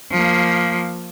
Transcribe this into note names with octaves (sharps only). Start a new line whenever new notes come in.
F3 A#3